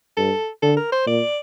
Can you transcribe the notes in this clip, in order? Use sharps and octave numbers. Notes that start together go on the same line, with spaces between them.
G2 A4
D3 A4
A#4
C5
A#2 D5